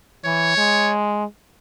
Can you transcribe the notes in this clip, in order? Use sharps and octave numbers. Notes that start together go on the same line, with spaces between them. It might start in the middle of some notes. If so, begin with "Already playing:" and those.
E3 C#5
G#3